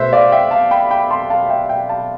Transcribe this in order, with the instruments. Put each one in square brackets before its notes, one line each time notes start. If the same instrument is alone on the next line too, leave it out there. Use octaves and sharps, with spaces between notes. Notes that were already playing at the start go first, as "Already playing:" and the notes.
Already playing: [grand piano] B2 A3 B4 C5 E5
D5 F5
E5 G5
F5 A5
G5 B5
G5 B5
A5 C6
F5 A5
E5 G5
E5 G5
F5 A5